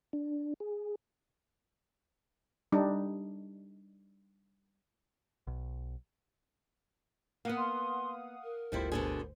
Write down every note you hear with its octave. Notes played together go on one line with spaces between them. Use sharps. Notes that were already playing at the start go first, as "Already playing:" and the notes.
D4
G#4
G3 D4 D#4
B1
A#3 B3 F5 F#5 D#6
C6
A#4
G1 D2 F3 G3 E4 C5
B2 D3 G#4